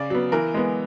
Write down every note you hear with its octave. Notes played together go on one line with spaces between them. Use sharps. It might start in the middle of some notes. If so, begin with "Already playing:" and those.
Already playing: C#3 D5
F#3 B3
E3 A#4
G#3 B3